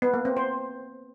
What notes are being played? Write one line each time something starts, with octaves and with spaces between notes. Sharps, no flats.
B3
A#3
C4
C5